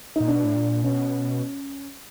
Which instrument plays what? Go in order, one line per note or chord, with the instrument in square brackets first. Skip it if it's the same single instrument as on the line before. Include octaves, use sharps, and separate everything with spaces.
[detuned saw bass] A#2 [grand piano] D#4
[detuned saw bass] B2 [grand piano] D4
[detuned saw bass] A2
A#2
[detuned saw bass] B2 [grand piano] C#4